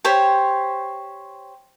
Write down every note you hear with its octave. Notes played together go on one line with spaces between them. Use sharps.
G4 C5 C#5